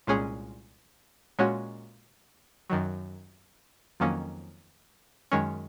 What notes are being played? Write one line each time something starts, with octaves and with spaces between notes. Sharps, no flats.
C2 A#2 G#3 C#4 G#4
A#2 G#3 C#4 F#4 C#5
F#2 D#3 F#3
F2 D#3 F#3 A#3 C#4
F#2 D#3 G#3 C#4